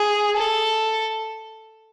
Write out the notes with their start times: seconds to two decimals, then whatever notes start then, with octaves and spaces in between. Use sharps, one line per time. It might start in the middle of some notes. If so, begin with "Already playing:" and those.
Already playing: G#4
0.36 A4